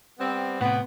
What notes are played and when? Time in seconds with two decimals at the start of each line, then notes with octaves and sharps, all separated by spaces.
0.19 G3 B3 C4
0.61 A2 C3 B3